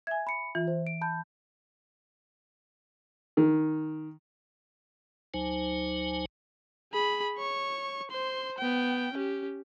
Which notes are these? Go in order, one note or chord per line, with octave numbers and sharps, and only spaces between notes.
E5 G#5 G#6
B5 C#7
E3 F4
C5
D7
A5 B5 G6
D#3
D2 F#3 D#4 C5 G#5
G#4 B5
C#5 C#6
C5 C6
B3 G5
C#4 G4